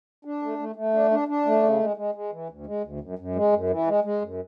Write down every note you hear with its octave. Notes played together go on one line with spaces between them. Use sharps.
D4
A3
A3
A3
D4
D4
D4
A3
C#3
G#3
G#3
G#3
E3
D2
G#3
D2
F#2
F#2
G#3
F#2
E3
G#3
G#3
F#2